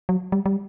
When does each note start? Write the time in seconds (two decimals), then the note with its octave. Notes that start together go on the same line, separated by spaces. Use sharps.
0.09 F#3
0.32 G3
0.46 G3